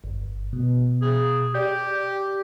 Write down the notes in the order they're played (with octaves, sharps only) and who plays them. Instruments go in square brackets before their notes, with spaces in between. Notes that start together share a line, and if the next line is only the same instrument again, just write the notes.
[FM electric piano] G1
B2
[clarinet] G#4
[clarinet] G4 [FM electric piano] D5 G5 G6